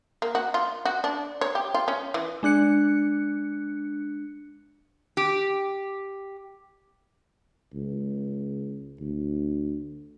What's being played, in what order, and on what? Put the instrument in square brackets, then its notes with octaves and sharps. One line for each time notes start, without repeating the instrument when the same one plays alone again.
[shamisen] A#3
F#4
F4
F#4
D4
C#5
G4
F4
C#4
E3
[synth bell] G#3 D4 F#6 C#7
[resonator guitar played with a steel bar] G4
[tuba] C#2
D2